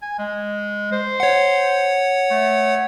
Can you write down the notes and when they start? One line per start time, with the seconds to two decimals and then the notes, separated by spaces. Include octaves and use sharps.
0.02 G#5
0.19 G#3
0.92 C5
1.20 C#5 F#5
2.31 A3